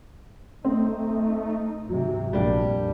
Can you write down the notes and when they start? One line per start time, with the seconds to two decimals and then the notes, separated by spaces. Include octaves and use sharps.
0.65 A3 C4 D#4
1.89 E2 G#2 C3 F#3
2.33 A#1 F2 G3 A#3 D4